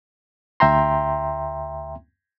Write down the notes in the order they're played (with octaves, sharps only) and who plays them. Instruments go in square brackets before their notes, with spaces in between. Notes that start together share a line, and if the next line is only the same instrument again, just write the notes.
[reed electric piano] D2 E5 G5 A#5 C6